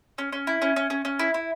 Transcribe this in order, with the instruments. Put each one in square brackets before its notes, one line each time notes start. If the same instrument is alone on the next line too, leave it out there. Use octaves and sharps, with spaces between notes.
[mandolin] C#4
C#4
E4
C#4
C#4
C#4
C#4
E4
E4